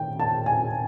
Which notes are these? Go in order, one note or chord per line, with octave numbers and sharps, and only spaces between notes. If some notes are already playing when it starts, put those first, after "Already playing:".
Already playing: D#3 G5
A5
G#5